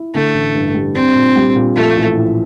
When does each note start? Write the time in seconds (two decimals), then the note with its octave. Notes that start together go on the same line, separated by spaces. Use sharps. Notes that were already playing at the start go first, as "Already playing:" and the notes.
Already playing: E4
0.14 D3 A3
0.34 A1
0.55 G2
0.74 G3
0.95 C4 D4
1.15 A#2
1.36 G3
1.56 A#2
1.76 F3 A3
1.96 A1
2.16 A2